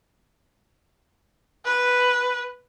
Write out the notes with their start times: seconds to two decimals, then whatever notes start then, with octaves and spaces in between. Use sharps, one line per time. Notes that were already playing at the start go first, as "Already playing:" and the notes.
1.65 B4